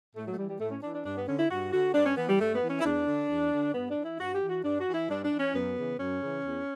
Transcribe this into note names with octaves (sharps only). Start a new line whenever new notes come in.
A2 A3
F#3
A3
E3 G3
G3
A2 A3
C#4
E3 D4
D4
G2 D4
B3
D3 C#4
E4
G2 F#4
D3 F#4
G2 D4
C#4
E3 B3
G3
G2 A3
B3
E3
C#4
E4
E2 D4
D3
E2
D3
G2 B3
D4
E3
E4
G2 F#4
G4
E3
F#4
G2 D4
F#4
E3
E4
G2 D4
D4
E3
C#4
F#2 B3
C#3 E3
F#2 C#4
C#3 E3
E2